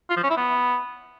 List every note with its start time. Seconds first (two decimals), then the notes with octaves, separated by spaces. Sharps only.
0.10 F4
0.17 F3
0.24 C#4
0.30 E4
0.37 B3